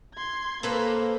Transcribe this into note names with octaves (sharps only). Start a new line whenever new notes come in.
C6 G#6
A#3 A4 B4 C5